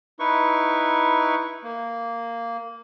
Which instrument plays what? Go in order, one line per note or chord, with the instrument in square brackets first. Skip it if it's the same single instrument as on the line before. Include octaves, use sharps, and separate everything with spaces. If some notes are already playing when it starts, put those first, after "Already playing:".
[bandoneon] D#4 E4 B4 C#6
A#3